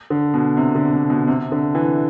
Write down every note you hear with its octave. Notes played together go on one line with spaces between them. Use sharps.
D3
B2
C3
D3
C3
B2
C3
D3
E3